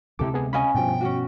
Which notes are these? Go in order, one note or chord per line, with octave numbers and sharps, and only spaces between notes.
D2 C3 G#3 E4 G4 A4 D6
B3 G#4
C#4 D#5 F5 G#5 B5
G2 B2 F3 G5
C#4 D4 F#4